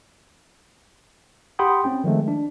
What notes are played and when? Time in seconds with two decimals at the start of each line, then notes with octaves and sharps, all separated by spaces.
1.59 G4 F#5 G5 B5 C6 D#6
1.84 C4 C#4 G5
2.04 D#3 F3 G#3 A3
2.28 D4